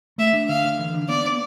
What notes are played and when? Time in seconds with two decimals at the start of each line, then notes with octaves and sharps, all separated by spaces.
0.18 A3 E5
0.33 D4
0.49 D3 F5
0.65 D3
0.79 E3
0.94 D4
1.09 B3 D5
1.25 B3